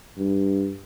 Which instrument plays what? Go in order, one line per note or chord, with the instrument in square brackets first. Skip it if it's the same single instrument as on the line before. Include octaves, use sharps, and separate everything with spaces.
[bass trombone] G2